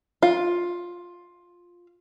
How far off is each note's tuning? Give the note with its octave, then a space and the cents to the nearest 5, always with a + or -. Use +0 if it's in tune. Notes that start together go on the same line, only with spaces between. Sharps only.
F4 +10